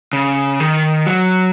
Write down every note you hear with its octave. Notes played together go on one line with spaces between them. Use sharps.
C#3
D#3
F#3